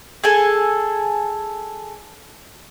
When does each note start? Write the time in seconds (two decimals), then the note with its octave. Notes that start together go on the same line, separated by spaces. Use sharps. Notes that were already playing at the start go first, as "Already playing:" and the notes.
0.24 G#4 A4 G#5